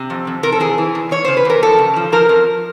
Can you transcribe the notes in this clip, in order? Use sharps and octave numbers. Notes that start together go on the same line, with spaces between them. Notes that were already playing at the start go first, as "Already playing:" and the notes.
Already playing: C3
F2
F2
C3 A#4
A4
E3 G#4
E3
E2
E2 C#5
C#3 C5
B4
E2 A#4
F3 A4
C#3
F3
F3 A#4
F2